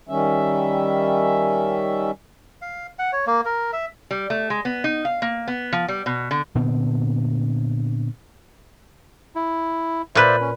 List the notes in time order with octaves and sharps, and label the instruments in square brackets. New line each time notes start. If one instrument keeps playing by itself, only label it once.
[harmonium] D#3 G3 C#4 E5
[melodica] F5
F#5
C#5
A#3
A#4
E5
[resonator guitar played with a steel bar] G3
A3
G#3
B3
D#4
F5
A#3
B3
F3
G3
B2
D3
[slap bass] A#2 D3 B3 C4
[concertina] E4
[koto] A#2 B4 [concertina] C5 D5 E5
[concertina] C#4